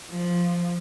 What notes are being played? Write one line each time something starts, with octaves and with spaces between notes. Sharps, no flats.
F3